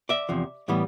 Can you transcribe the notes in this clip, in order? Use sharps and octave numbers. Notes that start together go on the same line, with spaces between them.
D5 E5
E2 C3 F3
A2 E3 G3 B3